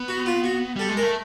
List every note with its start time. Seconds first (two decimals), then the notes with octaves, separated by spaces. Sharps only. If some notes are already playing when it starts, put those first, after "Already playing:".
Already playing: B3
0.08 F#4
0.26 F4
0.44 F#4
0.76 G3 A4
0.89 G#3
0.97 A#4
1.02 A3